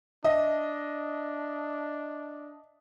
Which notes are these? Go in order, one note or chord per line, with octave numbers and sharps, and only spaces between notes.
D4 D#5 E5